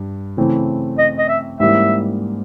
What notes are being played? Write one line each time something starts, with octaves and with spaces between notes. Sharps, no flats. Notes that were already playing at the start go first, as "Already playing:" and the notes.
Already playing: G2
C#3 E3 A3 C4
D#5
D#5
E5
G#2 E3 G3 A#3 C#4 E5